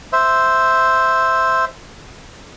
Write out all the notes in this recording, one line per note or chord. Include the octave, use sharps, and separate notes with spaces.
C5 E5